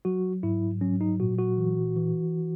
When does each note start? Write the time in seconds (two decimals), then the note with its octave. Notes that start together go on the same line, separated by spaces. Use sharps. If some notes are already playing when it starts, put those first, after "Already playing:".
0.05 F#3 F#4
0.43 G#2 E4
0.81 F#3 C#4
1.01 D#4
1.20 A#2 F#4
1.39 F#4
1.58 E3
1.97 E3